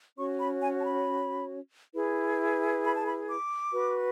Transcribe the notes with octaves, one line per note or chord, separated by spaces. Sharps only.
C#4 F#4 C#5 C#6
B5
G#5
A5
B5
E4 G#4 B4
B5
A5
B5
D6
F#4 B4